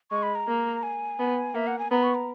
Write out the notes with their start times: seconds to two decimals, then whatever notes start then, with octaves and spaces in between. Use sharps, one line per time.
0.11 G#3 C#6
0.23 B5
0.35 A#5
0.48 A#3
0.83 G#5
1.19 B3
1.54 A#3 E5
1.67 F#5
1.79 G#5
1.91 B3 A#5
2.03 C#6
2.15 A#5